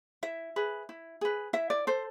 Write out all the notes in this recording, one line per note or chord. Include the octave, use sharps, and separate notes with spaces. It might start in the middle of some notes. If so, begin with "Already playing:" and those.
E4 E5
G#4 B4
E4
G#4 B4
E4 E5
D5
A4 C5